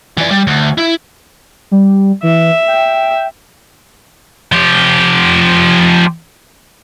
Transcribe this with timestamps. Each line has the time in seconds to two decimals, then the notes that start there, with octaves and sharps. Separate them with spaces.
0.18 E3 D5
0.31 G3
0.47 D2
0.78 E4
1.71 G3
2.23 E3 E5
2.67 G5
4.52 F3 G4